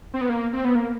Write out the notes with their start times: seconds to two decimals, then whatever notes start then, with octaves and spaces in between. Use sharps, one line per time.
0.14 C4
0.21 B3
0.29 A#3
0.53 C4
0.65 B3
0.75 A#3